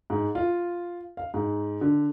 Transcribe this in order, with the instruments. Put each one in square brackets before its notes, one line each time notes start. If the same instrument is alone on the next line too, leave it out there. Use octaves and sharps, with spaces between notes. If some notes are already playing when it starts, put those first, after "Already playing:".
[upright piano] G#2
F4
F5
G#2
D3